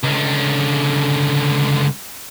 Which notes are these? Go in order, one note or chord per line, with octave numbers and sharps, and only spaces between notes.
C#2 D3